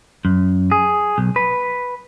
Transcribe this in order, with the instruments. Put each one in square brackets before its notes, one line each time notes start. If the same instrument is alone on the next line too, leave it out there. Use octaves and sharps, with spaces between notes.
[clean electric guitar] F#2
G#4
B1
B4